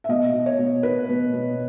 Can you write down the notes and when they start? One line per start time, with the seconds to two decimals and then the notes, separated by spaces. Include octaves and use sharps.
0.04 E5
0.09 B2 D#5
0.34 B2
0.46 C#5
0.59 B2
0.83 B2 B4
1.09 B2
1.34 B2